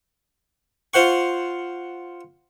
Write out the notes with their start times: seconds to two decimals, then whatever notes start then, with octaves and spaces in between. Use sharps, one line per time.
0.94 F4 C5 F#5 C#6